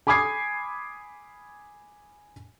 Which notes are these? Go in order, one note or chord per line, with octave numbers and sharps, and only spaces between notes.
G#5 B5 D6 D#6 G#6 C7